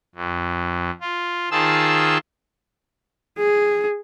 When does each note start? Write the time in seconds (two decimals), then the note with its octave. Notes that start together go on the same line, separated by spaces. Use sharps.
0.15 F2
1.01 F4
1.51 D#3 F4 G#4 C5 A5 E6
3.39 G#4